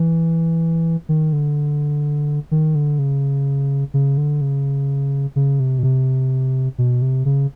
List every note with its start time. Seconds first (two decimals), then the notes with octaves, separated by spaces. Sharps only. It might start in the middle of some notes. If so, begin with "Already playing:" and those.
Already playing: E3
1.09 D#3
1.33 D3
2.51 D#3
2.75 D3
2.99 C#3
3.94 C#3
4.17 D3
4.41 C#3
5.36 C#3
5.60 C3
5.79 B2
5.83 C3
6.78 B2
7.02 C3
7.25 C#3